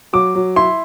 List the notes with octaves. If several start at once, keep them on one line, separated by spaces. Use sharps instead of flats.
F#3 D6
F#3
E4 C6